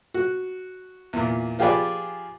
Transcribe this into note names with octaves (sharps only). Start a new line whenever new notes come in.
F#4
E2 A#2
F3 F4 G4 G#4 B4 D5